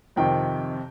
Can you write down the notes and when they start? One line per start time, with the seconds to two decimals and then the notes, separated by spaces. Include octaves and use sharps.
0.16 F2 C3 D#3 G5